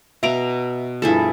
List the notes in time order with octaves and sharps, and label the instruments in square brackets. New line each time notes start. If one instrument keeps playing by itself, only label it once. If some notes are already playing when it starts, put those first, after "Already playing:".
[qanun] B2 A#5 [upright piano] E5 D7 F7
[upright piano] G2 F3 [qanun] E4 G#4 A4